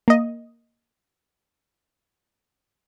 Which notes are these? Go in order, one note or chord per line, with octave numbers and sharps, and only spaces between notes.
A#3 D#5